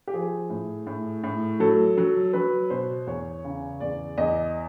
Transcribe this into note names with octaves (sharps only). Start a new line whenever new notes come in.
G4
F3 G#4
A2
A2
A2
F#3 A4
F#3
F#3 B4
B2 C5
E2 C#5
C#3
E2 D5
E2 D#5